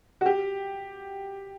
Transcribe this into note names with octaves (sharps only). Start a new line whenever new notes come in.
F#4
G4